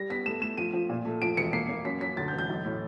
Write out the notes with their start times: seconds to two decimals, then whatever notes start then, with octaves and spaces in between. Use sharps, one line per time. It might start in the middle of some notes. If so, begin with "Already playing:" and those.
Already playing: G3 A#6
0.10 B3 B6
0.26 A3 E7
0.41 A3 E7
0.57 F3 D#7
0.73 F3
0.89 A#2
1.05 A3
1.22 F3 D7
1.37 E1 C#7
1.53 A#3 C7
1.69 A#3
1.85 F#2 B6
2.01 F#2 B6
2.17 D2 A6
2.28 G6
2.33 E1
2.38 G6
2.49 B1
2.64 A2